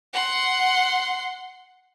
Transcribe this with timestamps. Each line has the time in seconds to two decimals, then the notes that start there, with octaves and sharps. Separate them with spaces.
0.13 F#5 C6